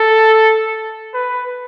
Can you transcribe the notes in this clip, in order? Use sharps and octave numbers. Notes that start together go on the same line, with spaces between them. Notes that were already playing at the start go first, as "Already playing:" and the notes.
Already playing: A4
B4